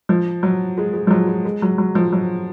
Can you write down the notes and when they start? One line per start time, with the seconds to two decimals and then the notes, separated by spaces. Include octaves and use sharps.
0.09 F3
0.43 F#3
0.78 G#3
0.93 G#3
1.07 F3
1.11 F#3
1.27 G#3
1.45 G#3
1.62 F#3
1.78 F#3
1.95 F3
2.13 F#3